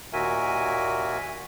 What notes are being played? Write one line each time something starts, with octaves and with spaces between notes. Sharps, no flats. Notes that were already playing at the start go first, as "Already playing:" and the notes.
D#2 A#2 F#4 A#4 E5 G#5